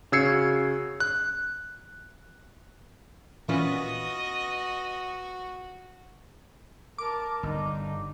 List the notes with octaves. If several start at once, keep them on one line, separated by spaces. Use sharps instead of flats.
C#3 F#4 E6 G#6 C7 C#7
F#6
A#2 E3 B3 C#4 F4 F#4 B4 D#5
A#4 A5 D6
G1 D4 D#4